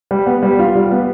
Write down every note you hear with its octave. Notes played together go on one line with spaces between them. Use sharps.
G3
B3
G3
F4
G3
B3